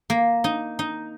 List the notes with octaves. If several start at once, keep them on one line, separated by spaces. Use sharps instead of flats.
A#3
D#4
D#4